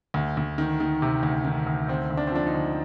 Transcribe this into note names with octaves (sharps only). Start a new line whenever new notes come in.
D2
D2
D#3
D#3
C3
D2
D#3
D2
D2 C4
D2
D4
C4
F3 D4
D#4
D2